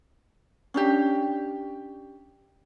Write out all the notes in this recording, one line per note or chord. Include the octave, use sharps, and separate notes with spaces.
C#4 D4 G4